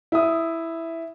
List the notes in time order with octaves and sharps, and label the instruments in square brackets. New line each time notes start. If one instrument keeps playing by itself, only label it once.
[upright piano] E4 E5 D#6